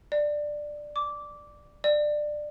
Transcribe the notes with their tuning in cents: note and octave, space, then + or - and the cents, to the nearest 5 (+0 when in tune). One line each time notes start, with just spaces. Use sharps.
D5 +10
D6 -15
D5 +20